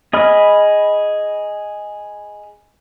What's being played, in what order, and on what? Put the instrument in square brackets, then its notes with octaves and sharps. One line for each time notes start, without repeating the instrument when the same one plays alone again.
[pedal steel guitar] G#4 D#5 B5 F6